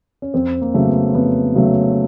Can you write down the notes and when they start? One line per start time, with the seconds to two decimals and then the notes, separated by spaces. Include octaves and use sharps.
0.22 C#4
0.34 F2 C4
0.61 A#3
0.74 C#3 F#3 A3
0.88 B3
1.14 F2 B3
1.55 C#3 F#3 A3